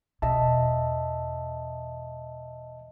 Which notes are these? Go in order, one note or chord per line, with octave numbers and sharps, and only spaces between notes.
E2 B2 D#5 E5 A5